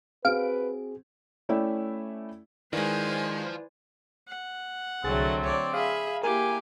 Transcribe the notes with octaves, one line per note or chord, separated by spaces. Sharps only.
C4 F#4 G#4 B4 F5 D7
A3 C#4 E4 D5 E5 G5
D#3 F3 G#3 E4 B4 C5 D5 G#5
F#5
C2 D3 F#3 A3 C4 G#4 A6
C#5 D5
G#4 E5 F5 B5
A#3 E4 G4 A#4 F5 G#5